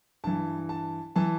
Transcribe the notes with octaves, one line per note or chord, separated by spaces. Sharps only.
G2 E3 A5
A5
E3 A5